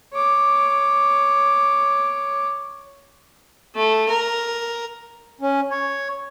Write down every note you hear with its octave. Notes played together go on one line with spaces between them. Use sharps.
C#5 D6
A3
A#4
C#4
C#5